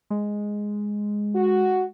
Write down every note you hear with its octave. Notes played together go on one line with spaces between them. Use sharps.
G#3
F#4